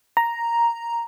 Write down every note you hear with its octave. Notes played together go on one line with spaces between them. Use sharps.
A#5